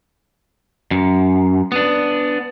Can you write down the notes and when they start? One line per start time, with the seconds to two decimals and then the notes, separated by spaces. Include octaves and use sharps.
0.91 F#2
1.72 B3 D4